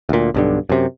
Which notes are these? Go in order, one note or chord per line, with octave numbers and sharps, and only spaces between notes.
D2 A#2
B1 G2 D3
F#2 C3